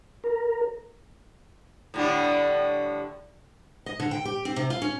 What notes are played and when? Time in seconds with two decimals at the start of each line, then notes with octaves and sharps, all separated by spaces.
0.24 A#4
1.94 A2 D3 G3
3.86 D#5
4.00 D3
4.11 G5
4.25 G4
4.45 C4
4.56 C3
4.70 F4
4.82 C#4